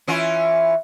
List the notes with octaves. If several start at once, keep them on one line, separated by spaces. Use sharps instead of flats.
E3 C#4 F4